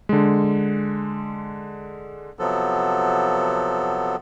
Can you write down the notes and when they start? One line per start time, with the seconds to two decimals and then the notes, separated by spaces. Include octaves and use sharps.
0.09 D3 G#3
2.39 C3 F3 F#3 B3 A4